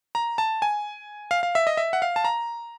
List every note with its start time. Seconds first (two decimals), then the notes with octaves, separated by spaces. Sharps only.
0.15 A#5
0.38 A5
0.62 G#5
1.31 F5
1.43 F5
1.55 E5
1.67 D#5
1.77 E5
1.93 F#5
2.02 F5
2.16 A5
2.25 A#5